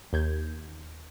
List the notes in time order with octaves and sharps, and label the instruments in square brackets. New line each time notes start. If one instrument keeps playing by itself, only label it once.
[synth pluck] D#2 G6 G#6